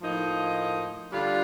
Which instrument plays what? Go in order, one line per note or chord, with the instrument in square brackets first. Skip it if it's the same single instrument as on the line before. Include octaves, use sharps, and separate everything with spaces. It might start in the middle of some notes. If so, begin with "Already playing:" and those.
[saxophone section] A2 F3 A#3 D#4
D3 G3 D4 F4